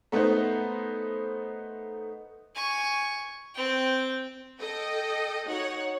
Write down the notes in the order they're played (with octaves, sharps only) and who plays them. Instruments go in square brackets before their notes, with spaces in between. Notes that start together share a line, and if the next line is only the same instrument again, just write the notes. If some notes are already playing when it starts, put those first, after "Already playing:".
[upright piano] A3 B3 D#4 B4 C5
[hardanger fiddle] G#5 C#6
C4 G5
[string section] A4 D#5 G5
D#4 F#4 C#5 F#5